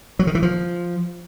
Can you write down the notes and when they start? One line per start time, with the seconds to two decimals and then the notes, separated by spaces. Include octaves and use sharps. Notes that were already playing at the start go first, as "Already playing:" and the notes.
0.19 F#3
0.27 D#3
0.35 E3
0.42 F3